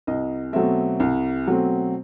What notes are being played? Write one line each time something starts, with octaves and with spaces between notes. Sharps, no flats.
C2 D#5
B2 F#3 A3 C4 E5
C2
B2 F#3 A3 C4